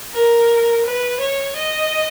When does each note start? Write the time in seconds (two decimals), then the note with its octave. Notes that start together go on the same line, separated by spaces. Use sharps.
0.14 A#4
0.85 B4
1.21 C#5
1.56 D#5